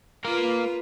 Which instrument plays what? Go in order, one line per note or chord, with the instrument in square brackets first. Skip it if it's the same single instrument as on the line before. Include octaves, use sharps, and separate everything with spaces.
[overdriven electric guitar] A#3 A#4 [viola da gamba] F4 B4